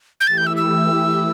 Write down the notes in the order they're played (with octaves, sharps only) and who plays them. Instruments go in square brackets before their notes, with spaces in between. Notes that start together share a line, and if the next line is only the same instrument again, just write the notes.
[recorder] G6
[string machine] E3 A3 E4 G4 [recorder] A6
[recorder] G6
E6
E6